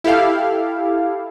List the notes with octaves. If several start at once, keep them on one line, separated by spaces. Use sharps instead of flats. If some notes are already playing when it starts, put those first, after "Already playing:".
E4 G4 A4 F5